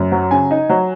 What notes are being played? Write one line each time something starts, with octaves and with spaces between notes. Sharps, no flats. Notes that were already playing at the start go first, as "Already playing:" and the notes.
Already playing: F#2
F#3
C#3 G#5
D#4
F#3